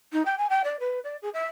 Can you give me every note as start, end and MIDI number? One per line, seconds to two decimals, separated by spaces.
0.13 0.23 63
0.26 0.38 79
0.38 0.47 80
0.50 0.62 79
0.64 0.77 74
0.80 0.99 71
1.04 1.17 74
1.22 1.30 68
1.34 1.45 76